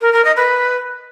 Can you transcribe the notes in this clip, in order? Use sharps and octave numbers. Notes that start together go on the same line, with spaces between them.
A#4
A#4
D#5
B4